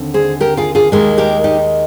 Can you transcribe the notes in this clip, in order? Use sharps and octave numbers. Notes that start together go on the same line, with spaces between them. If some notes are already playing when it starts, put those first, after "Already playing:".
Already playing: D#2 D3 C4
G#4 C5
G4 A#4
F4 G#4
F4 G#4
D#2 D#3 G#3 G4 A#4
G4 A#4
D#4 G4